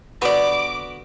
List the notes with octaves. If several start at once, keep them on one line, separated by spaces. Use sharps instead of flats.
D3 B3 F#4 G4 B4 D5 D6